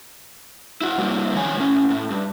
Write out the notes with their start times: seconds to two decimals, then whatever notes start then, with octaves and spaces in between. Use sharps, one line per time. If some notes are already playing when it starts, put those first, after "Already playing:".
0.81 E4 F#4
0.98 C3 G3 A#3 E4
1.34 F2 D#3 C#5 G#5
1.57 A2 C#4
1.90 A2
2.10 G2